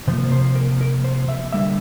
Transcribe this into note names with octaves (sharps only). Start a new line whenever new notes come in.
C3 F3 A#3 C5
C5
A#4
A#4
C5
E5
D3 G3 A#3 E5